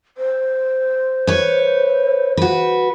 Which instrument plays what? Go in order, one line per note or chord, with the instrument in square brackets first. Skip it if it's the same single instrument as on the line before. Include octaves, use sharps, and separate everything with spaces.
[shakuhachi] C5
[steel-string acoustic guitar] B4 C#5
F#4 B4